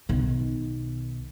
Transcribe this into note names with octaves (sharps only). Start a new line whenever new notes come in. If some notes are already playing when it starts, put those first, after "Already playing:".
B1 D#3